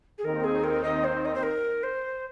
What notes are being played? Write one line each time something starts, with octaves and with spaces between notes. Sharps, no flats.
G#4
D#2 D#3 C4 D#4 A#4
G#4
A#4
D#5
C5
D#5
C5
A#4
C5